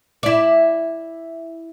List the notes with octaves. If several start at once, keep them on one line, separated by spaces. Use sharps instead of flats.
E4 D5